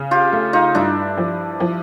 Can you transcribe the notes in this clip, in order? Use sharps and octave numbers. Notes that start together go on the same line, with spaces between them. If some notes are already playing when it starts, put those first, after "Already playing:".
Already playing: C#3
F4 G4
A3
D#4 F4
G2 D4 E4
F3
F3